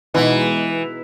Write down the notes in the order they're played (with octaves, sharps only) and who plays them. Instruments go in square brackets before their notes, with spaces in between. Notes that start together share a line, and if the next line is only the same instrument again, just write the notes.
[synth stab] B2 G#3 B3 D#4 [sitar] E3